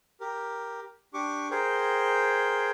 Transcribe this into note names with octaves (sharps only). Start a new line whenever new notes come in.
G4 A#4
D4 G4 C#6 D6
G#4 A#4 C5 G5